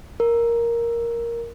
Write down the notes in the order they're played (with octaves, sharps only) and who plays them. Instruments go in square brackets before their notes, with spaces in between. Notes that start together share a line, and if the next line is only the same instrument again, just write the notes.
[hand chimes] A#4